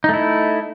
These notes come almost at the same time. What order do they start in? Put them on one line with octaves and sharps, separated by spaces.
D#4 A3 E4